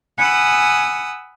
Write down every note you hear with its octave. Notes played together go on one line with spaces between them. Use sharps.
F#5 G#5 B5 D#6 E6